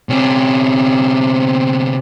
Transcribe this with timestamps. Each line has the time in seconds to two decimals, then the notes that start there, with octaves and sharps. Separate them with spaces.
0.09 C3 C#4